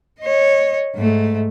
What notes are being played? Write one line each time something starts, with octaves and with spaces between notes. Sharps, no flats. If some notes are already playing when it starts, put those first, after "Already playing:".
C#5 D#5
G#2 A3